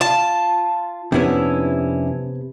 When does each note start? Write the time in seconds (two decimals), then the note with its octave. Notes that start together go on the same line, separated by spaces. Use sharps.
0.01 F4 A5
1.12 F2 C3 B3 C#4 D4 E4 E5